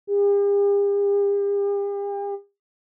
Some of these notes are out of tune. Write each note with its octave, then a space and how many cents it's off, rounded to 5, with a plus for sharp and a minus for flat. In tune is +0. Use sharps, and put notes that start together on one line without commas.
G4 +45